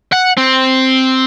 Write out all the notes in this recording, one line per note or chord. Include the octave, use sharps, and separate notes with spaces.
F#5
C4